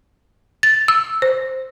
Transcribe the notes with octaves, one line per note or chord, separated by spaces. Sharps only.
A6
E6
C5